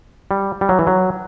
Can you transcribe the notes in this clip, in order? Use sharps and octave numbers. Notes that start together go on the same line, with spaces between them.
G3
G3
F#3
E3
F#3